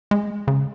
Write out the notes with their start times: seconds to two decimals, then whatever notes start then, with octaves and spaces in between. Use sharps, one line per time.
0.11 G#3
0.48 C#3